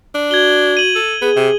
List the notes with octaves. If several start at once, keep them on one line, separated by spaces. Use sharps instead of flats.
D4
F#4 G#6 G7
D#7 F#7
A4
B3 G#4
C3